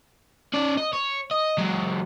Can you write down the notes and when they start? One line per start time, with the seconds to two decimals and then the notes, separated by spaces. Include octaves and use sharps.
0.54 C#4 D5
0.77 D#5
0.93 C#5
1.31 D#5
1.58 F#3 G#3